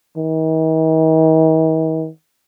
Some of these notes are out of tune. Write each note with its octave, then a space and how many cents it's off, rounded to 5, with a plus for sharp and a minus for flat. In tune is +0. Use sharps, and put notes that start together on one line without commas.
D#3 +45